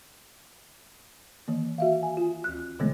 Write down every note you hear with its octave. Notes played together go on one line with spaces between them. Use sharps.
D#3 E3 A#3
F#4 E5 F5
G#5
F4
D2 F#6
B2 D3 E3 G#3 A3 B3